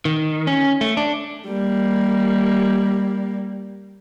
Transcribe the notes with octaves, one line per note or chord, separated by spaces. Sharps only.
D#3
C#4
A3
D4
G3 A#3